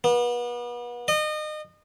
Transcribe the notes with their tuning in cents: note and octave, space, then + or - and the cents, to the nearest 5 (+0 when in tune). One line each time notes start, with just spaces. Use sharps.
B3 -35
D#5 -30